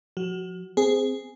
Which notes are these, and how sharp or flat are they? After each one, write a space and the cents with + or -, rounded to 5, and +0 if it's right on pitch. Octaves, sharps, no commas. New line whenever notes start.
F3 +30 F#4 +15
C4 -15 G#4 +0